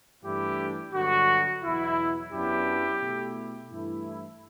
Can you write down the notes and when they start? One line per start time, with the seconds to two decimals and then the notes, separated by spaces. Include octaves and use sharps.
0.23 G2 E3 A3 D4 E4 G4
0.93 G2 D3 F#3 B3 F#4
1.62 E2 B2 F#3 E4
2.32 F#2 F#3 B3 D4 E4 G4
3.01 B2 A3 E4
3.70 G2 E3 A3 E4